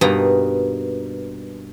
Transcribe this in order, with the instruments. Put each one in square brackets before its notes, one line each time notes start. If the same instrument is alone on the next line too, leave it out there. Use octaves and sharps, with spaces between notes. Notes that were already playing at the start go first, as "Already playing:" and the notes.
[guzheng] G2 B2 A#3 D#4 B4 A#5